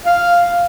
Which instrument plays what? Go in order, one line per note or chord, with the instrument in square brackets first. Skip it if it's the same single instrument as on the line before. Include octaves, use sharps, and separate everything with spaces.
[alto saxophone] F5